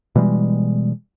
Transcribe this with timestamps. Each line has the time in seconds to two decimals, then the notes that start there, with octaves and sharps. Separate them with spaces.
0.15 B2 E3 G3 G#3